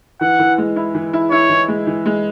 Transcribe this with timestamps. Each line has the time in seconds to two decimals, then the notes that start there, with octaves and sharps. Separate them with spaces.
0.21 E3 F#5
0.39 E3
0.58 G#3
0.76 E4
0.94 E3
1.13 E4
1.31 E4 C#5
1.50 E3
1.68 G#3
1.87 E3
2.06 G#3